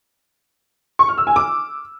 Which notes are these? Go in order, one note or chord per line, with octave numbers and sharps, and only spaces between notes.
C#6
F6
E6
G#5
D6